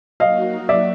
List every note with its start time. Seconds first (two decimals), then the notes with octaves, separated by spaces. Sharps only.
0.20 F#3 A#3 D#4 F#4 D#5 F5
0.69 D5 E5